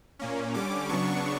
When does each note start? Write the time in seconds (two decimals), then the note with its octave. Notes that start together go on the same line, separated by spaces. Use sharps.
0.19 A#2 A#3 C#4
0.54 D3 G3 C#4 D6
0.89 C#3 F#3 B3 D4 C#6